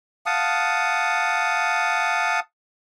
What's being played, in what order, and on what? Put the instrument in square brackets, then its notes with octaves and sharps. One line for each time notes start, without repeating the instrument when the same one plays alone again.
[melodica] F5 F#5 A5 D#6